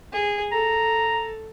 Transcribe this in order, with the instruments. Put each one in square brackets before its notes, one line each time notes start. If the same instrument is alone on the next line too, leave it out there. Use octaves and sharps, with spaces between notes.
[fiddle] G#4
[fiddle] A4 [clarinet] A#5